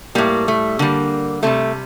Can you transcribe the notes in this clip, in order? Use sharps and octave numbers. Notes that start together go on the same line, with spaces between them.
A2 G3 A#3
A3
D3 G3 A#3
C3 G3 A3